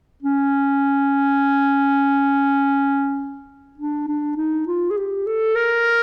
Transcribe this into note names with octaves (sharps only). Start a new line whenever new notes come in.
C#4
D4
D4
D#4
F4
G#4
G4
A4
A#4